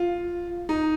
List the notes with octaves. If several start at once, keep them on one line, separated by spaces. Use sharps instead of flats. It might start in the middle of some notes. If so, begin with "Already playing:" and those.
Already playing: F4
D#4